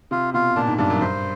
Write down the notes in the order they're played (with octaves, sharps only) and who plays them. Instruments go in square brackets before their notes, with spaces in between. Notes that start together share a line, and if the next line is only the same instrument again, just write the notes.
[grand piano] C3 [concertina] F4
[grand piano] B2 [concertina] F4
[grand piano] A#2 [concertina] D4
[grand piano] G#2
[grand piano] G2 [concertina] D4
[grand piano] F#2
[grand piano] G2 [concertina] C5